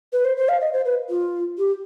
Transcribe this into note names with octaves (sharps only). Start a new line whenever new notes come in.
B4
C5
C5
F5
D#5
C5
B4
F4
G4